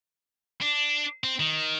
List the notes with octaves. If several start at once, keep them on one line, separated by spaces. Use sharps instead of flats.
D4
C4
D#3